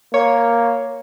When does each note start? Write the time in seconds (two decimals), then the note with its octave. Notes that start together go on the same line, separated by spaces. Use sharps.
0.14 A#3 C#5